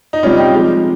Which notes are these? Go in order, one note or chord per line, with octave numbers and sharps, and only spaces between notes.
D#4
C3 G3 C#4 F4
D#4 G4
C3 F3 G#3